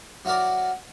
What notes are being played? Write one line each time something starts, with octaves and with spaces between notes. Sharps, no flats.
F#3 E4 F#4 A#4 D5